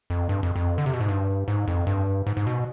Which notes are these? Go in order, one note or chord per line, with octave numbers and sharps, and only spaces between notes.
F2
G2
F2
F2
D3
C3
B2
G#2
G2
G#2
F2
G2
G#2
G#2
B2